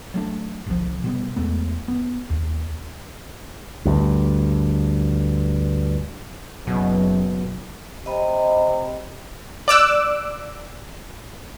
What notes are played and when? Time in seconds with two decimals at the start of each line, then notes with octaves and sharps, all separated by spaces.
0.14 F#3 A3 D4
0.66 G1 C2 F3
1.04 B2 G3 B3
1.36 E2 G#3 A3 B3
1.88 B3
2.30 D#2
3.85 D2 G2
6.67 F#1 B2
8.06 C3 D#5 B5
9.68 D5 D6 E6 F#6